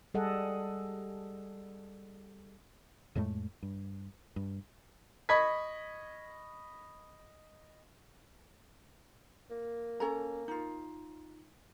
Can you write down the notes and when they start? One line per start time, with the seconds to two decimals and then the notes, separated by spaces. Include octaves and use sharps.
0.14 G3 G#4 A4 D#5 F#5
3.15 F2 A2 G#3 A3
3.63 G2
4.36 G2
5.29 D#5 B5 C#6 G#6 B6
9.51 A#3
10.00 C#4 A4 A#5
10.48 D#4 F4